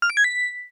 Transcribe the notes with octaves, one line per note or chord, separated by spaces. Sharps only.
F6
D7
G#6
B6